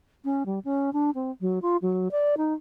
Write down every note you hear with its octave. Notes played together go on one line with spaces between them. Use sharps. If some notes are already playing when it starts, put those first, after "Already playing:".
C#4
G3
C#4
D4
C4
F#3
F4
F#3
D5
D#4